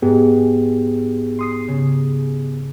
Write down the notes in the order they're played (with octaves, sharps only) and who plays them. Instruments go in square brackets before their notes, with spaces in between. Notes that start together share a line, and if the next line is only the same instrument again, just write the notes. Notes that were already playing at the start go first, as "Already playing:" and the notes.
[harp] G#2 [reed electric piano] B3 G4 G#4
[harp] C6 D#6 C7
C#3